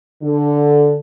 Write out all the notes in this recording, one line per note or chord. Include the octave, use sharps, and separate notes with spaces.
D3